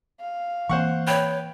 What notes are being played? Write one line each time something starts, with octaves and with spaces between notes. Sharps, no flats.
F5
E3 A#3 C4 C5 F#5 C#6
B4 C#5 G5